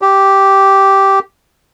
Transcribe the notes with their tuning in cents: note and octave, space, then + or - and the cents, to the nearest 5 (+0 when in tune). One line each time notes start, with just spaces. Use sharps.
G4 -5